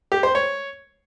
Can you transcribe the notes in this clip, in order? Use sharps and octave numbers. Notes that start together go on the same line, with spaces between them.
G4
C5
C#5